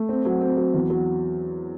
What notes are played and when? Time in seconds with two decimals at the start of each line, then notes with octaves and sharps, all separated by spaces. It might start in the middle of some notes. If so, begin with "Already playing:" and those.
Already playing: A3
0.09 C4
0.25 F#3
0.41 C4
0.57 F#3
0.74 E2
0.90 F#3